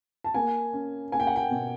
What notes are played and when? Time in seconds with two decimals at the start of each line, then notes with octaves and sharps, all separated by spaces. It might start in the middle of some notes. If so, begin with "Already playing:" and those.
0.24 A5
0.34 A#3 G#5
0.73 C#4
1.12 A#3 G#5
1.20 G5
1.27 F#5
1.36 G5
1.51 B2